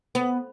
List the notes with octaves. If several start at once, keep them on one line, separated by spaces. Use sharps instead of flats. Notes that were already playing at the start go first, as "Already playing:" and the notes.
B3